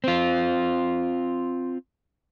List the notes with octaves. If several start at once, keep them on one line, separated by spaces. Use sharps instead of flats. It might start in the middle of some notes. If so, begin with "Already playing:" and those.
C4 F4